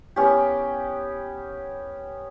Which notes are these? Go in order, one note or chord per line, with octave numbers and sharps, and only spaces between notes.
B3 C#4 G4